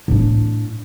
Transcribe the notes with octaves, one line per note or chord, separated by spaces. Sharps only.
A2 D4